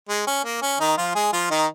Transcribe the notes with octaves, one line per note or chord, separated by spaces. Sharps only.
G#3
C#4
A#3
C#4
D#3 D#4
F3 F4
G#3 G#4
F3 F4
D#3 D#4